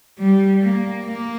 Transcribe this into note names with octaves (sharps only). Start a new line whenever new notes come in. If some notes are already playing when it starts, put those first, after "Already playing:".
G3
A#3
A#3